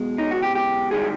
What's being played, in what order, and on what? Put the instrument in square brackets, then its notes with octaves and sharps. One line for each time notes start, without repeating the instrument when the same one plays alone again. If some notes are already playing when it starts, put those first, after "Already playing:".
Already playing: [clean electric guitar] B1 B2 G#3
D#4
F#4
G4
G4
G#2 D#3 G3 G#4